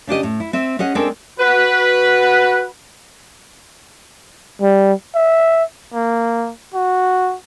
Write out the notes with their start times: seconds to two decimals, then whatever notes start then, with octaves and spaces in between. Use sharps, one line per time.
0.07 C#3 D4 G4 D#5
0.23 A2
0.40 E4
0.53 C4 E5
0.79 C#4 G#4 D#5 F#5
0.95 G#3 C4 D4 A4 A#4
1.40 F#4 B4
4.62 G3
5.15 E5
5.94 A#3
6.74 F#4